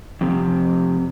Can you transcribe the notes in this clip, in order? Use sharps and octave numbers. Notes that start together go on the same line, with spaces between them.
F2 C3